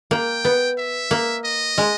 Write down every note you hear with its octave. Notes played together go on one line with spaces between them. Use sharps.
A#3 G5
B3
E5
A#3
D#5
G#3